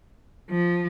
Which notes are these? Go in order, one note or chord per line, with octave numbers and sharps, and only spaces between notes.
F3